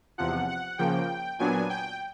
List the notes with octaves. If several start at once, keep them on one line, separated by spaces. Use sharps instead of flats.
E2 C3 F3 F#5
F#5
C#3 F3 A#3 G5
A#2 F#3 B3 D4 G#5
G5